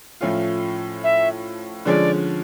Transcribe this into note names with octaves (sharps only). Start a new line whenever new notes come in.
A2 F3 A3 C#4 F4
E5
D3 F3 G#3 C#4 D5